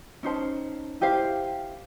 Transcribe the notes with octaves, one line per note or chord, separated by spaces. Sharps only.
C#4 D#4 C5 A5
E4 G4 C5 F5